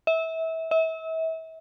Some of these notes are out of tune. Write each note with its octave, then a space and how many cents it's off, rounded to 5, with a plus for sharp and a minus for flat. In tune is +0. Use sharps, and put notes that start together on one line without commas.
E5 -25
E5 -35